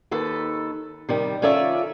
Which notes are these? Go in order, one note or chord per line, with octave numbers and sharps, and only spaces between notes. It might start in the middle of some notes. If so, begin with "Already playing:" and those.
D#2 D#3 A4 B4
C3 D#3 G3
D#3 C#4 F4 A4 D5 E5